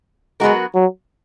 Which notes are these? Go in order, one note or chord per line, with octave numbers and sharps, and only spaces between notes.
F#3 G#3 B3 F#4 A#4
F#3